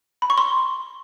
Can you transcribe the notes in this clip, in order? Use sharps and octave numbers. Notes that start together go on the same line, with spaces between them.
B5
C#6
C6